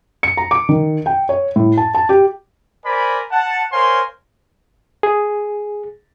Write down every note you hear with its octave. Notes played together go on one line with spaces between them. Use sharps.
C#7
A#5
D6
D#3
G5
C#5
A2
A5
A5
G4
A#4 C5 D5 G#5 B5
F#5 A5
A#4 C5 C#5 F5 G#5 C6
G#4